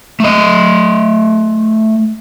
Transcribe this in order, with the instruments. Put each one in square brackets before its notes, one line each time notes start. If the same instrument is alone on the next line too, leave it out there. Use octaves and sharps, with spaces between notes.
[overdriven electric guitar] A3 D#5